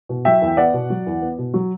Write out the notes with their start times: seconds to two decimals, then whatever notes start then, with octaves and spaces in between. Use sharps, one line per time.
0.09 B2
0.25 F#3 E5 G5
0.42 E2
0.47 G5
0.57 B3 D5 F#5
0.74 B2
0.90 F#3
1.06 E2
1.22 B3
1.38 B2
1.54 F#3